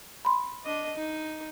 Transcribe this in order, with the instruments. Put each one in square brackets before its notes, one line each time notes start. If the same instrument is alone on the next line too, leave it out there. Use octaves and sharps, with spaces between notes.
[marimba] B5 C6
[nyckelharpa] D4 D#5
D#4